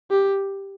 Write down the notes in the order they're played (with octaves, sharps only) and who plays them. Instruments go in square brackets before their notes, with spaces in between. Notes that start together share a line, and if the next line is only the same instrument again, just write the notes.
[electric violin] G4